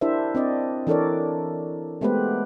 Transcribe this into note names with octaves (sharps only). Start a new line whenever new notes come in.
D4 E4 G4 A#4 C5 E5
C4 D4 D5 D#5
E3 D4 A4 A#4 C#5 D5
G#3 A3 B3 G4 B4 C5